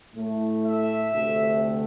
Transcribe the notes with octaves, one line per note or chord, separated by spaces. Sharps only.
A2 A3
E5
D2 C3 A3